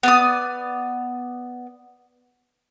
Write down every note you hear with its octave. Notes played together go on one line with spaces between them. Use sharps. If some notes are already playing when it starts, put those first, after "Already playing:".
B3 D5 D#6